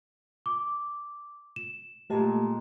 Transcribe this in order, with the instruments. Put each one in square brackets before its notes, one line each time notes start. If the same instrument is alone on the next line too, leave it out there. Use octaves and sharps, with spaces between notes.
[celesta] D6
E7
[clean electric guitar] A#2 G#3 [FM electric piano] A3 G4 A5